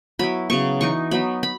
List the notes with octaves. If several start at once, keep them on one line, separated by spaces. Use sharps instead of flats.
F#3 B3 E4 B5
C#3 F#3 B3 C#6
E3 B3 D#4 C#6
F#3 B3 D#4 B5
B5